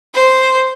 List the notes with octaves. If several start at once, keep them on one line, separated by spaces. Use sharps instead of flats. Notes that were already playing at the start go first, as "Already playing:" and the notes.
C5